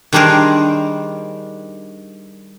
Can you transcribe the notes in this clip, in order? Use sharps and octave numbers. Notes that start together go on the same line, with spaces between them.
D#3 G3 D4 G#4 A#4 C5